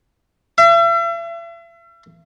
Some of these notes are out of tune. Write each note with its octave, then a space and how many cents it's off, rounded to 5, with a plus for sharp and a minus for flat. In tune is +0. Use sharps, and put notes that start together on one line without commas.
E5 +40